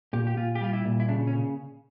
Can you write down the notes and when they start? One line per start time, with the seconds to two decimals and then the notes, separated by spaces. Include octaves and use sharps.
0.13 A#2 G4
0.27 G4
0.37 A#2 F4
0.55 G4
0.61 G3 F4
0.73 E4
0.85 A#2
1.00 E4
1.09 C#3 D4
1.27 C#4
1.33 C#3